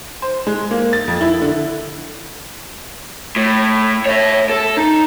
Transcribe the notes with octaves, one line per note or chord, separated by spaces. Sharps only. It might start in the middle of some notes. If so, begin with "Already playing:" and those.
C5
G#3
A#3
A6
F2
E4
D3
A2
C#5 E5
A4
D#4